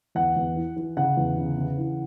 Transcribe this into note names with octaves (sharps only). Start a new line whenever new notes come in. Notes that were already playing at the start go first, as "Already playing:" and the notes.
E2 F#5
E2
E3
E3
C#3 F#5
E2
C#3
C#3
E3